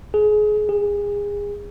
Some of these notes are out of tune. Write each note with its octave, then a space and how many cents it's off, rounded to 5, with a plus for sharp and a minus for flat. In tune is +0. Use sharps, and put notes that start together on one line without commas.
G#4 +25
G#4 -25